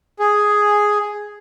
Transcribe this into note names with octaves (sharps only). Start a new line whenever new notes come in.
G#4